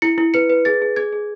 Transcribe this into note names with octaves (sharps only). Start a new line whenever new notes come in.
E4 C#7
E4
B4 C#7
B4
G#4 A6
G#4
G#4 G#6
G#4